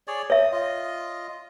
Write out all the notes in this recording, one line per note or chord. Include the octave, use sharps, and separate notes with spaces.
G#4 C#5 D5
C#5 E5 D#6
F4 D#5